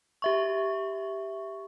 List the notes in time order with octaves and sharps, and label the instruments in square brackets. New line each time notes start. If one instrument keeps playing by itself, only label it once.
[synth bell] G4 E5 C#6